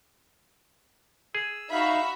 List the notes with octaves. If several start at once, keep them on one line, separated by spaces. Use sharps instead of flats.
G#4 E6
D#4 F#4 E5 F5 B5